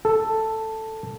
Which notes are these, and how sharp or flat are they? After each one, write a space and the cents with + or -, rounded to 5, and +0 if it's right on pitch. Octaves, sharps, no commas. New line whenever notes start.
A4 +5